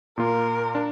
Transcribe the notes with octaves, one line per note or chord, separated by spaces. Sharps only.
A#2 A#3 F4 A#4
D4